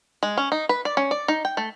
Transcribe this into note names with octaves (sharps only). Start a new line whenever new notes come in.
G#3
C#4
D#4
B4
D5
C#4
D5
D#4
G5
A3